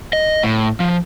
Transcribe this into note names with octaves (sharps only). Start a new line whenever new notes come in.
D#5
A2
F3